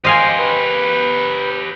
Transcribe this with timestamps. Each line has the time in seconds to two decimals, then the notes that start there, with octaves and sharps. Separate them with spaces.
0.05 G4 A#4 C5 D#5 F5 G#5
0.38 B4